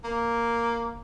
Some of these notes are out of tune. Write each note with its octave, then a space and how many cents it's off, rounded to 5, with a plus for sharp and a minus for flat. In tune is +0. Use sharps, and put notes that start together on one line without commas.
A#3 +0